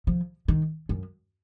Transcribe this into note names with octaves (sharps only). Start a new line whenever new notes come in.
F3
D#3
F#2